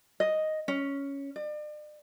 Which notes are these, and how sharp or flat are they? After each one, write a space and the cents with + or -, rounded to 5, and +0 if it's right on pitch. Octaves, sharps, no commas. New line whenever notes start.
D#5 +5
C#4 +5
D5 +40